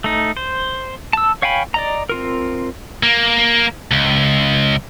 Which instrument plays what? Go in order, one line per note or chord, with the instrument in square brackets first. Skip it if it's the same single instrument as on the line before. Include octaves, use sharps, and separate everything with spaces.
[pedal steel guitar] A3 D#4
C5
A5 E6
C#5 F5 G5 G#5 B5
D5 D#5 A#5
C4 F4 A#4
[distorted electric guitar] A#3
C#2